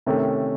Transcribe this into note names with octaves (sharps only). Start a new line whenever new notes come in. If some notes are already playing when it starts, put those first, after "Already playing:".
C3 D#3 A3 C#4